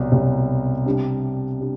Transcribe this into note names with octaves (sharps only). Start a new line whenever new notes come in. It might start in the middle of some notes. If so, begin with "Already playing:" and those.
Already playing: C2 B2 F#3
C2 B2 F#3
C3 G3 D4
G3 D4